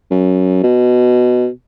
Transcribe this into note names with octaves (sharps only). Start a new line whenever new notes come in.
F#2
B2